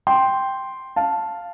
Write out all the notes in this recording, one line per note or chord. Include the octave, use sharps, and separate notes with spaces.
G5 C6
F5 A5